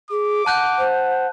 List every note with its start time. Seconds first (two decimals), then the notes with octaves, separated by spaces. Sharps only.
0.11 G#4 D6
0.46 F#5 A5 F#6 G6
0.78 C5